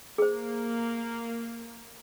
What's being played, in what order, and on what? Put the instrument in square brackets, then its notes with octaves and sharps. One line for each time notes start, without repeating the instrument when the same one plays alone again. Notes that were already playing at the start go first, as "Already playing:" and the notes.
[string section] A#3 [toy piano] G#4 C5